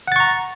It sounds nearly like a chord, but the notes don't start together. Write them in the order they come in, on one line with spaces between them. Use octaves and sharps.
F#5 A6 C#6 A#5